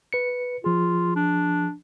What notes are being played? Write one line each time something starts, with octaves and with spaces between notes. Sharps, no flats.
B4 C#7
F3 F4 G#4
D4